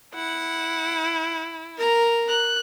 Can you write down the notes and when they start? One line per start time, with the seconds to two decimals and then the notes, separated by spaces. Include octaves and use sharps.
0.15 E4 F#5
1.77 A#4 A#5
2.29 F#6